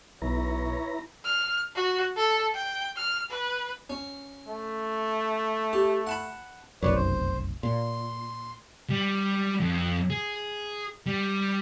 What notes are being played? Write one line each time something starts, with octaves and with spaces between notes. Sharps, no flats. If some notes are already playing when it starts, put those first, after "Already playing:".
B1 E4 B4 C#5 A#5
F6
F#4
A4
G5
F6
B4
C#4
A3
G4
F#5 A5 B5
F1 B1 F#2 B4 C#5 D5
C5
A#2 C6
G3
F2
G#4
G3